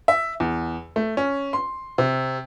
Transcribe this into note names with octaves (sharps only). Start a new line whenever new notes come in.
E5
E2
A3
C#4
C6
C3